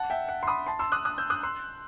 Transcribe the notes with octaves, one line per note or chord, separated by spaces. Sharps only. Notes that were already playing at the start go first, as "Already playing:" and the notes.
Already playing: F#5 A5
E5 G5
F#5
C6
B5 D#6
A5 C6
C6 E6
D#6 F#6
D#6 F#6
E6 G6
D#6 F#6
C6 E6